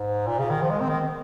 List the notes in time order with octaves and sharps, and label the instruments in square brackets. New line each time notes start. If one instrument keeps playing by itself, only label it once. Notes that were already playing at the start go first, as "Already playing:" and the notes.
Already playing: [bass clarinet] G#2
A#2
C#3
D#3
F3
G#3
C4
D#3